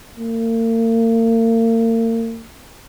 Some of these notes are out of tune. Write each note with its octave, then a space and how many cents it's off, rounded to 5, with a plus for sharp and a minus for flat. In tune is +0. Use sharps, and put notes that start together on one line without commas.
A#3 -40